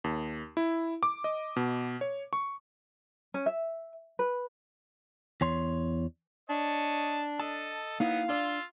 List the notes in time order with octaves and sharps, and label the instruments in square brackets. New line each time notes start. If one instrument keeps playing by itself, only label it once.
[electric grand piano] D#2
E4
D6
D#5
B2
C#5
C#6
[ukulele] C#4
E5
B4
[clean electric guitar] E2 C#5 C6
[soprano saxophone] D4 [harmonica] C#5 D#5 A5
[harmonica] A4 D#5 [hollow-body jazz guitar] A5
[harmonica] F#3 B3 [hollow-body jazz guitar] A#3 D#4 E4 [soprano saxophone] F5
[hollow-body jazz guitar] D4 D5 [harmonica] F4 C6 E6